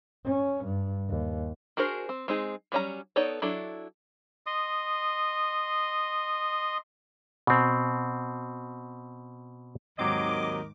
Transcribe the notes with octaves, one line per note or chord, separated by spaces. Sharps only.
C#4
G2
D#2
D4 F#4 G#4 A#4 C5
C4
G#3 C4 D#4 G#4
F#3 G3 C#4 F#4 A#5
B3 D#4 A4 C#5 D5
F#3 D4 E4 A4
D#5 C6 D#6
B2 C4
D#2 G#2 D#3 F#3 C4 A#4 D#5 D6